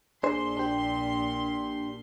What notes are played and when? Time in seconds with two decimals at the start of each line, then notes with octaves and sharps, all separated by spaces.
0.23 A#1 A#2 D4 G#4 C5 C6
0.57 D4 G4